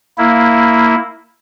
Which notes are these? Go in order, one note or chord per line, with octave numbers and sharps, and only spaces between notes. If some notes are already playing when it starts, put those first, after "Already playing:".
A#3 E4